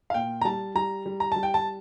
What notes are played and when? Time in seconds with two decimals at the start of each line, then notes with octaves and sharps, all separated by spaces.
0.10 F5
0.14 A#2 G5
0.41 A#5
0.45 G3 A5
0.75 G3 A#5
1.06 G3
1.20 A#5
1.32 G3 A5
1.43 G5
1.54 A5